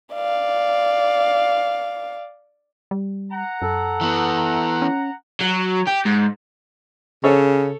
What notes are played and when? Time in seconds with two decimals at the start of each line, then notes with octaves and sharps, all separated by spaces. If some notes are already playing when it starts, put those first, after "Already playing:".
0.14 D5 F5
2.91 G3
3.32 F#5 A#5
3.62 F#2 A4
4.01 E3 B3
4.82 C#4
5.41 F#3
5.87 G4
6.06 G#2
7.24 C#3 A4 C#5